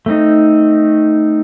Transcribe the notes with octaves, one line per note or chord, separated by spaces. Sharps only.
A3 C4 D#4